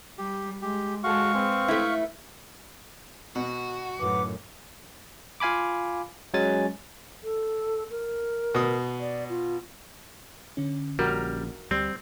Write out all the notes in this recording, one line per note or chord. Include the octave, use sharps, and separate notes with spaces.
G3 G4
G#3 G4
G#3 F#4 G#4 A4 F5 C#6
C4 B4
A3 E4
B2 F#4
F#2 A2 D#3 B4 F#5 D6
F4 F5 G#5 B5 D6
F#3 G#3 C#4 G#5 A6
A4
A#4
B2 D#6
D5
F4
D3 C#4
A#1 G3 F#4 A#4
D2 G3 C4